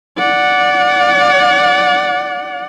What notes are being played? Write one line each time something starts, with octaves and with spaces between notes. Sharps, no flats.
D5 F#5